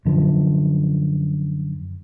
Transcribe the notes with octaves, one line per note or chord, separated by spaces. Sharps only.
F#2 D3 F3